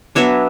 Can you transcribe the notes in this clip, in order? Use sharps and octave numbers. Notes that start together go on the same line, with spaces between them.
F#3 B3 D4 C#5 E5